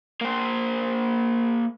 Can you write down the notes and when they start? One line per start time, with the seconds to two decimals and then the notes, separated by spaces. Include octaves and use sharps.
0.21 A#3 C5